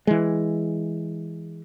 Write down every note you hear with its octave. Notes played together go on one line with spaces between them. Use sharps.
E3 G#3